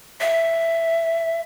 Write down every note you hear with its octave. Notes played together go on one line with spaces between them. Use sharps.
E5